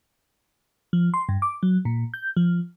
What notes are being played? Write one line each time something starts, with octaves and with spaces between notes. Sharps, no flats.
F3
C6
G2
D6
F#3
A#2
G6
F3